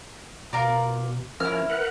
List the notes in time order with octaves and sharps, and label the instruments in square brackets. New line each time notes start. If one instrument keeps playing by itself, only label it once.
[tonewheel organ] B2 [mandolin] F4 A#4 D5
[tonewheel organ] F3 C#4 A#4 [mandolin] E4 F6
[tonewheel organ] A#4 B4 F#5